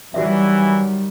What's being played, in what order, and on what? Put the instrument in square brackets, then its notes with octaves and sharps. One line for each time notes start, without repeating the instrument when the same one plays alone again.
[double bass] D#3 G3 [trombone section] E3 [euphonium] F#3 [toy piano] F#4 D5 E5